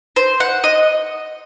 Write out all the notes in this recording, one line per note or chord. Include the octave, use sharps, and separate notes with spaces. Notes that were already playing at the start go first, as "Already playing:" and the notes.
C5
F#5
D#5